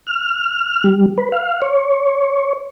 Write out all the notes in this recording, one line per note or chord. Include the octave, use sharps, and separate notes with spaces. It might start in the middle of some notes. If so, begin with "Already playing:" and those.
F6
G3
B4
F5
C#5